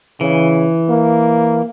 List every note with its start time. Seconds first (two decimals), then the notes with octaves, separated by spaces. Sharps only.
0.21 C#3 E3
0.89 A#3